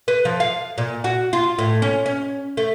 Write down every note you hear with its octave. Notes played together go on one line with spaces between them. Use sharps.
B4
F3
F5
A#2
F#4
F4
A2
C#4
C#4
A3